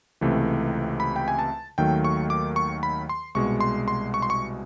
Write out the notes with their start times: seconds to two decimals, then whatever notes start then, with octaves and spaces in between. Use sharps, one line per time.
0.21 C#2 C3 E3 A3
1.00 B5
1.16 G5
1.28 G#5
1.39 A5
1.78 D#2 D#3 F#3 A3 G5
2.05 C#6
2.30 D6
2.56 C#6
2.83 B5
3.09 C6
3.35 C2 B2 G#3 C#6
3.60 C6
3.88 C6
4.14 C#6
4.22 C6
4.30 C#6